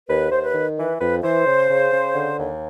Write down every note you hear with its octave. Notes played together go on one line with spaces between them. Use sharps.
D#2 B4
D#2 C5
B4
D#3
E3 B4
F2 B4
E3 C5
C#3
C#3
C#3
D3
D#2